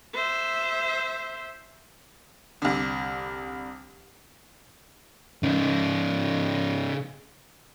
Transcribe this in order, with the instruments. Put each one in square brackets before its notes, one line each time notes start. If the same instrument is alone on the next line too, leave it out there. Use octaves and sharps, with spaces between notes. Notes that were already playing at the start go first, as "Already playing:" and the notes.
[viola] C5 E5
[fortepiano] C2 D3
[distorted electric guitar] C#3 D#4